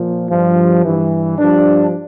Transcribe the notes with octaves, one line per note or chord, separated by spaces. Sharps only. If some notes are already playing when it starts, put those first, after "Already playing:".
Already playing: A#2 F3
G2 F3
G2 E3
G2 F3 D4